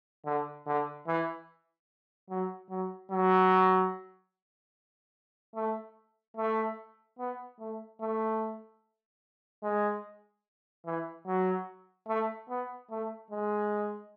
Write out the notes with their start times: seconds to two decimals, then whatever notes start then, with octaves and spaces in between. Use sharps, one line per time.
0.26 D3
0.66 D3
1.07 E3
2.30 F#3
2.70 F#3
3.11 F#3
5.55 A3
6.37 A3
7.19 B3
7.60 A3
8.01 A3
9.63 G#3
10.85 E3
11.27 F#3
12.08 A3
12.49 B3
12.90 A3
13.30 G#3